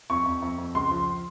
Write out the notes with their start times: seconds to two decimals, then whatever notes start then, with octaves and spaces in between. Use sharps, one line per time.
0.10 F2 C#6
0.26 F2
0.42 F2
0.58 F2
0.75 C#2 C6
0.91 F3